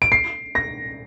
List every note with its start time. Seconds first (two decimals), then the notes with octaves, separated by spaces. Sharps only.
0.02 D7
0.12 C7
0.55 A#6